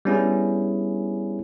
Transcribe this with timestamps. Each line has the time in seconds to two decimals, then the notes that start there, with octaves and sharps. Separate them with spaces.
0.05 G3 B3 C#4 D4 E4 G#4